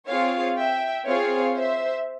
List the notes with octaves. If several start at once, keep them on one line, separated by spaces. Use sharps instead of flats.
C4 F4 G#4 C#5 F5
E5 G5
C4 F4 G#4 C#5 F5
C5 E5